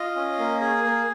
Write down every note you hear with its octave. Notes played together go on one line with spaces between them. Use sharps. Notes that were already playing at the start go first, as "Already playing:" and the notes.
Already playing: F4 D#5
C#4
A#3
G#4
A#3